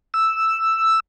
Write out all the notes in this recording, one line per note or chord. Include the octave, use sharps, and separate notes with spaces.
E6